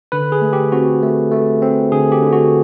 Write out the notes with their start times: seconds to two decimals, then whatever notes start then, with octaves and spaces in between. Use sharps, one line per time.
0.12 D3 B4
0.32 G#4
0.42 A3
0.53 G4
0.72 C4 F#4
1.02 A3
1.32 A3
1.62 C4
1.92 D3 G#4
2.12 G4
2.22 D3
2.32 F#4